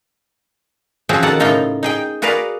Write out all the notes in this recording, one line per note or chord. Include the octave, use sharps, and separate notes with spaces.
F3 C4 C#4 F#4 G#4
B2 D#3 A#3 A4 F#5 A5
A2 C#3 A#3 D#4 F4 A4
D#4 G#4 G5
F#4 G#4 A#4 B4 D5 F5